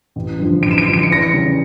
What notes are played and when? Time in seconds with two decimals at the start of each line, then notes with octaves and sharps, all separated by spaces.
0.16 A1
0.39 G2 D3 F3
0.62 A1 D7
0.71 E7
0.78 D7
0.86 G2 D3 F3
0.93 D7
1.03 C#7
1.09 E2 A#6
1.22 C#7
1.32 C#3 G3